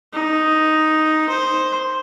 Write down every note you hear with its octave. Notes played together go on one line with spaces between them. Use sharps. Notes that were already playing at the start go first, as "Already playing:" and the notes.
D#4
C5